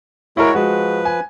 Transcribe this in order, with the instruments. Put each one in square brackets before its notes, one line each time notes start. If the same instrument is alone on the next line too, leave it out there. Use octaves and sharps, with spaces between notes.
[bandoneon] G#3 F#4 C#5 [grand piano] E4 A#4
[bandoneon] F3 B4 [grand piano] G#3 F#4
[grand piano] G#5